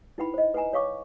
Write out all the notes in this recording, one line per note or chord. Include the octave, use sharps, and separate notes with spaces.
D#4 E4 B4 F#5 G5 B5
C5 D#5
B4 F#5 G#5 A#5
C#5 F5 C#6 D6